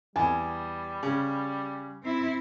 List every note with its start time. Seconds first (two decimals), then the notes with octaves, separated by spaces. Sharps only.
0.16 E2 G3 G#5
1.03 C#3
2.03 C4 E4